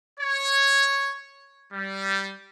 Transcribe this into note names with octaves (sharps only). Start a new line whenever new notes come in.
C#5
G3